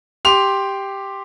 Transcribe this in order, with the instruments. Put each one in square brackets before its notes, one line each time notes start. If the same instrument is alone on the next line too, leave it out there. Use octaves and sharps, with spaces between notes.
[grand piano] G4 C6 D6 F7